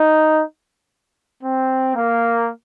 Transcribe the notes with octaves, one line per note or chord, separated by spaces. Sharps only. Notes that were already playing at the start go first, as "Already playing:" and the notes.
Already playing: D#4
C4
A#3